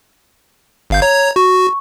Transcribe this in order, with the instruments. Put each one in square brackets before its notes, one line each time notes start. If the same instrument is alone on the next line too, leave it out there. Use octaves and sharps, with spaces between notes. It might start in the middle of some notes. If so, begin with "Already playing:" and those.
[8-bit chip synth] G1 F5 G6
C#5 A#5 G#6
[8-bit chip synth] F#4 [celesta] C#6